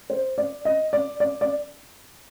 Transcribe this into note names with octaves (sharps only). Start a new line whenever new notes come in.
C5
D5
D#5
D5
D5
D5